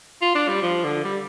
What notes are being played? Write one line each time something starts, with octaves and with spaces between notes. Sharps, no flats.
F4
D4
G3
F3
D3
G3